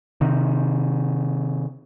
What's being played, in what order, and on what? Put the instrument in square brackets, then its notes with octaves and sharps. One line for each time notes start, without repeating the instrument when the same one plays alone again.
[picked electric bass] C3 D#3